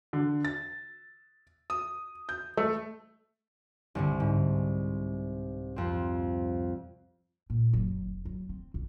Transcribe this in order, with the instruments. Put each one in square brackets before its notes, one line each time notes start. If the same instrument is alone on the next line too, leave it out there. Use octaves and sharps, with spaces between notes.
[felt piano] D3
A6
D#6
G6
A3
[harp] C2 G2 D3
G#2
F2 C4
[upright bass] A#2
F#1 F#3
F1
F#3
C4
B1 E2